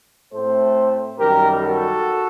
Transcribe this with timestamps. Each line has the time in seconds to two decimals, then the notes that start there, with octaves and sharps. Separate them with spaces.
0.33 A2 A3 C4 A4 C5
1.19 F#2 D#3 G3 G4 A#4
1.62 F#4 A4